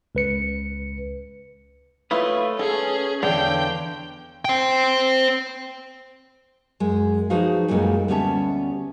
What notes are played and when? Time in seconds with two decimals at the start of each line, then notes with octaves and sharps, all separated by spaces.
0.15 C#2 B4 C#7
2.11 A3 A#3 E4 F4 B4 C#5 D#6
2.59 C#4 G#4 A4
3.23 E2 G2 D3 D4 C#5 F5 G5
4.45 C5 G5
6.80 F#2 G#3
7.30 F3 D#4 F#4 G#4 B4 F5
7.68 F#2 A#2 G3 G#3 A4 A#4
8.08 D2 G3 B3 C#4 E5 A5